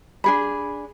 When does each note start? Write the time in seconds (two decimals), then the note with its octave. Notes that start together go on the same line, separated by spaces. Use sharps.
0.24 D4 G#4 B5